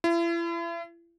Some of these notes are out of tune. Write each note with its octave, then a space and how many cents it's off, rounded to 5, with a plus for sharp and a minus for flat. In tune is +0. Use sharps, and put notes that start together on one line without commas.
E4 +40